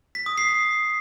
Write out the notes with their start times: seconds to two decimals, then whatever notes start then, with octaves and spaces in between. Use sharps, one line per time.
0.15 B6
0.26 D#6
0.38 C7
0.49 C7